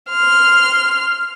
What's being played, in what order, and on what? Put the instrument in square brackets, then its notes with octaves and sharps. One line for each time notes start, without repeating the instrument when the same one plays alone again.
[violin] C6 F6